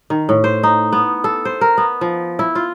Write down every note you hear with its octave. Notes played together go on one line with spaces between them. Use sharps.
D#3
A2
C5
D#4
B3
A4
C5
A#4
B3
F3
E4
F4